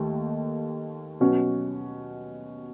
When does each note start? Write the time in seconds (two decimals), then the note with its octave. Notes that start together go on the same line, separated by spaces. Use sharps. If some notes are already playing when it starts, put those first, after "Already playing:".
Already playing: D#2 D#3 A3
1.21 B2 F#3 C#4 F#4